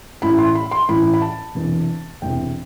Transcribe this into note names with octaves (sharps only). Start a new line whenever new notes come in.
A1 A2 E3 B5
C6
B5
C6
A1 A2 E3 B5
B5
A5
E1 E2 C3
E1 E2 C3 G5